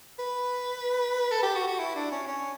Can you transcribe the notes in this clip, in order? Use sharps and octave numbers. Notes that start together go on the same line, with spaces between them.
B4
A4
G4
F#4
F#4
E4
D4
C#4
C#4